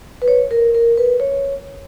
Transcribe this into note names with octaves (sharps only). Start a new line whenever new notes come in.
B4
C#5
A#4
A#4
B4
C#5